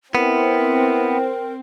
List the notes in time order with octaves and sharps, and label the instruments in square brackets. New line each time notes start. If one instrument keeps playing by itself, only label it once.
[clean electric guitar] B3 [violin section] C4 [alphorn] E4 [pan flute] A#4